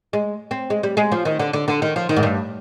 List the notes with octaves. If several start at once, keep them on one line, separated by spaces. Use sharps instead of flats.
G#3
C4
G#3
G3
G#3
F3
D#3
D3
D3
D3
D#3
F3
D#3
G#2
G2